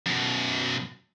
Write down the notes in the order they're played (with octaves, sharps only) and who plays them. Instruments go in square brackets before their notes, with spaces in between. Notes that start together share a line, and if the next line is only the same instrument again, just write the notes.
[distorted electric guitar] F#2 B2